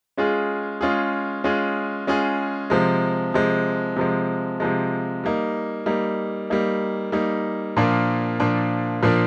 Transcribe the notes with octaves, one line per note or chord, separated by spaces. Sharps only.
G#3 C#4 F4 G#4
G#3 C#4 F4 G#4
G#3 C#4 F4 G#4
G#3 C#4 F4 G#4
C3 F3 G#3
C3 F3 G#3
C3 F3 G#3
C3 F3 G#3
G3 A#3 D#4
G3 A#3 D#4
G3 A#3 D#4
G3 A#3 D#4
A#2 F3 A#3 D4
A#2 F3 A#3 D4
A#2 F3 A#3 D4